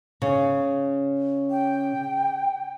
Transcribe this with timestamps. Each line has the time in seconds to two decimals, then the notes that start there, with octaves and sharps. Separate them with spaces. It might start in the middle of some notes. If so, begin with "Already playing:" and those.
0.22 C#3
1.51 G5